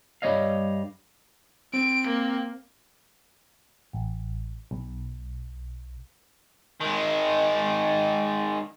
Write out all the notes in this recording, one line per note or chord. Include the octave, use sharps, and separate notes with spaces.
G2 G3 G#3 C#5 D#5 F5
C4 D7
A#3
A1
B1
D#3 G#3